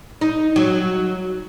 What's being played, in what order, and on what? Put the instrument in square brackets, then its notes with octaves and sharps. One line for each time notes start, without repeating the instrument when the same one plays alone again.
[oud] D#4
F#3